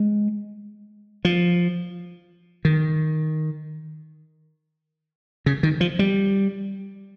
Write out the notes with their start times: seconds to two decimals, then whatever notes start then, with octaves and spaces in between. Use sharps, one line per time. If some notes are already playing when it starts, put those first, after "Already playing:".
Already playing: G#3
1.25 F3
2.65 D#3
5.46 C#3
5.63 D#3
5.81 F3
5.99 G3